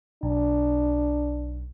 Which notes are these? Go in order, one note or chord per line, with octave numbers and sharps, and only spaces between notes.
B1 D4